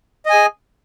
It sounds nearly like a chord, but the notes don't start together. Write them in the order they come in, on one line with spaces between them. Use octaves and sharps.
D#5 G#5 G#4